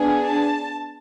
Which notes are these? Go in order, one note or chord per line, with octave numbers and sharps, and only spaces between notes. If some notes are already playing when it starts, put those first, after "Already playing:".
Already playing: B3 D4 G#4
A5